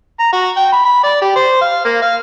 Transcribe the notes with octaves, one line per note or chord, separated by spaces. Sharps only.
A#5
F#4
G5
B5
B5
D5
G4
C5
F5
A#3
F5